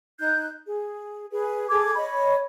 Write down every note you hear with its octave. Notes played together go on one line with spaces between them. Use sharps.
D#4 F#6 G6
G#4
G#4 B4
G#4 A4 D6 G#6
C#5 D#5 B5